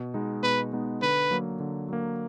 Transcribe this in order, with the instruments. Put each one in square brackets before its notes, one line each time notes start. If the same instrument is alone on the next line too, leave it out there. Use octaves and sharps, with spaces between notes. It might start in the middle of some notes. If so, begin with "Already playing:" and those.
Already playing: [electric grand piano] B2
G#3 B3 D#4
[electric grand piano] B2 [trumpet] B4
[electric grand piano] G#3 B3 D#4
[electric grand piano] D3 [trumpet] B4
[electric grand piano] F#3 A#3
D3
F#3 A#3